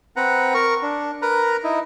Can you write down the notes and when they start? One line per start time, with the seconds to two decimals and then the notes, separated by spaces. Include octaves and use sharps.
0.16 C4 B4 F#5 A#5
0.54 A#4 C#6
0.83 D4
1.22 A#4 B4 A#5
1.64 D#4 E4